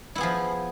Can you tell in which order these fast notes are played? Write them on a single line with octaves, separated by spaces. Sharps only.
E4 B3 G#4 F3